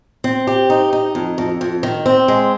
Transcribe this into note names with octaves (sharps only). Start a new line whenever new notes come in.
C4
G4
D#4
D#4
F2
F2
F2
D#3
C4
G#3